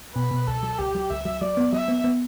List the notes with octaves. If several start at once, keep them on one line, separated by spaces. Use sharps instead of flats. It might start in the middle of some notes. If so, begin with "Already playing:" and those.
B2 B4
B2
C#2 A4
F#3
C#2 G4
F#3
C#2 E5
F#3
F#3 D5
B3
F#3 E5
B3
B3